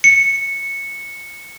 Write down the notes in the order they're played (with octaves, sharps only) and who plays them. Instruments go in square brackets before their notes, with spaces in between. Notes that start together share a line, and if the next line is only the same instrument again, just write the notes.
[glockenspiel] C#7